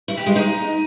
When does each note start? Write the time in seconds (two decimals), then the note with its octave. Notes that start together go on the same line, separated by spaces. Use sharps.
0.08 E4
0.17 G4
0.27 G#3
0.36 D#4